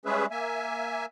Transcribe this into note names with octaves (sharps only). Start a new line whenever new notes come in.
G3 G#3 C#4 G#4 B4 E5
A#3 E5 G#5